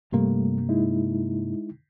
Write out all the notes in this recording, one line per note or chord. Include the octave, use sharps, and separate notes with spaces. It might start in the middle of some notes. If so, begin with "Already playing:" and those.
G2 C3 G3 A3 A#3
G#3 D#4 E4